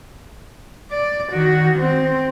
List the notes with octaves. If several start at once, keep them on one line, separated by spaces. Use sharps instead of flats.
D5
D#3 F#4
C4